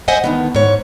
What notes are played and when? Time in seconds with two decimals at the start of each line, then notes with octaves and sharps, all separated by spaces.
0.08 C5 D#5 E5 F#5 G#5
0.24 D3 D#3 B3
0.55 G#2 C#5